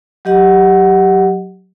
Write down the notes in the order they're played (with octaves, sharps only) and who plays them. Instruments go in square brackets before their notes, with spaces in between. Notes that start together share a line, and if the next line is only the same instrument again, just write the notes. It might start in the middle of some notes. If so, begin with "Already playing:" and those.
[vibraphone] F#3 G4 D#5 F#5